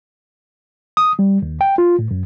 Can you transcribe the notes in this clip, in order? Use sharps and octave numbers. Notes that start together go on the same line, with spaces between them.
D#6
G3
D#2
G5
F4
A2
F#2